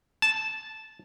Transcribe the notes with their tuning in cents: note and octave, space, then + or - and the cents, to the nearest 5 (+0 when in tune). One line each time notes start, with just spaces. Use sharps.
A5 -10